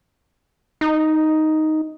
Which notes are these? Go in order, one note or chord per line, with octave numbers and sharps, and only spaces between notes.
D#4